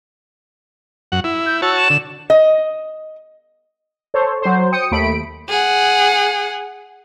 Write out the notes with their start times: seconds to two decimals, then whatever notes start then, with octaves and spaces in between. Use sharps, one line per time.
1.12 F#2 F#5
1.24 E4
1.46 G6
1.62 F#4 C#5 A5 E6
1.77 E7
1.90 D3
2.30 D#5
4.14 A4 C5 C#5
4.42 F#3 C5
4.72 G5 D#6 C#7
4.91 D#2 A3 B5 D7
5.49 G#4 F#5